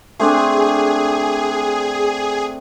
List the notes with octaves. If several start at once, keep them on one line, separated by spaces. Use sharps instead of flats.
A3 C4 D4 G#4